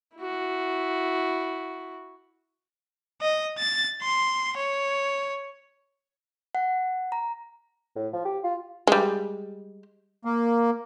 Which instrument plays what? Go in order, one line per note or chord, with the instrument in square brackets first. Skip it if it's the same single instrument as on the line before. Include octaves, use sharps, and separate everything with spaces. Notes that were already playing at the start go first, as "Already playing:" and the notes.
[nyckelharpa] E4 F#4
[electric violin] D#5
A6
C6
C#5
[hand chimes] F#5
A#5
[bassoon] A2
F3
G4
F4
[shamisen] G3 G#3
[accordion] A#3